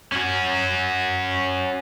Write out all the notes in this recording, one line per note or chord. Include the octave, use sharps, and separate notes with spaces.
C#4 F#4